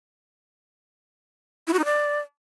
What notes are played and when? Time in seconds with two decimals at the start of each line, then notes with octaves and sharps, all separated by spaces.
1.67 E4
1.73 F#4
1.79 D#4
1.85 D5